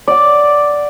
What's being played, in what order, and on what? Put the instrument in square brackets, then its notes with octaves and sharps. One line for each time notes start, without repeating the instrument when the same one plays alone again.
[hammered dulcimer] D5 F#5